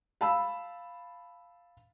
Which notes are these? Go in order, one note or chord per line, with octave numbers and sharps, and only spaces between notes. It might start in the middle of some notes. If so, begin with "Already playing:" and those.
F5 A5 B5 E6